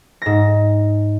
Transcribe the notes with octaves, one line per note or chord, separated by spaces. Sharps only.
G#2 A#6